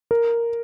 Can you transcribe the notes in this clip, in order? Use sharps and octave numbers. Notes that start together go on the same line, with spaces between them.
A#4